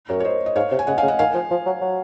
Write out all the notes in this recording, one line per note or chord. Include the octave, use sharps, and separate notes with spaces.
F#2 A#4 C#5
C#5
C5 D#5
D#5
G#2 C#5 F5
C3
G#5
C#3 D#5 F#5
F5 G#5
C#3
D#5 F#5
D#3 F5 G#5
F3
F3
F#3
F#3